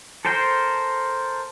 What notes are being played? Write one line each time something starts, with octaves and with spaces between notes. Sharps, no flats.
A4 A#4 C5 G5